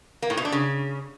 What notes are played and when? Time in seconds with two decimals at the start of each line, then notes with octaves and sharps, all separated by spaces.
0.22 A#3
0.30 A2
0.37 B2
0.45 D4
0.52 C#3